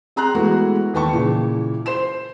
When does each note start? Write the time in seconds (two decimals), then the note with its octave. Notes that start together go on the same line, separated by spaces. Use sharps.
0.16 C4 G#4 A#5 C6 F#6
0.34 E3 G#3 A3 B3 F#4
0.94 D#2 B4 G5 A5 C#6
1.12 A#2 C#3 E3
1.86 C5 C6 E7